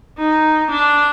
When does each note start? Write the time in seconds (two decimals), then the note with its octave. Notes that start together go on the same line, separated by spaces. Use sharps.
0.18 D#4
0.70 D4